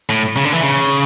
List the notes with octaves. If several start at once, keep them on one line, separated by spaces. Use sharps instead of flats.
A2
C#3
D3
E3
C#3